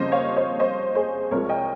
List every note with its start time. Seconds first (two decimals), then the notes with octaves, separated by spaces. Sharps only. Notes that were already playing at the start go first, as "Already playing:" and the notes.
Already playing: F2 C#3 G3 A#3 C5 D#5
0.12 C#5 F5
0.36 C5 D#5
0.59 C5 D#5
0.95 G#4 C5
1.31 C2 C3 F3 G#3 A#4 C#5
1.49 D#5 G5